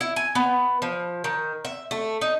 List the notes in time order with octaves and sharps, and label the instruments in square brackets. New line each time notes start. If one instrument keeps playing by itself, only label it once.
[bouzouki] E4
G#5
B3
F3
D#3
E5
A3
D#4